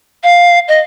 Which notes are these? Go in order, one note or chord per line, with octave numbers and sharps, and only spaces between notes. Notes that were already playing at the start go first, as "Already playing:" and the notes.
F5
D#5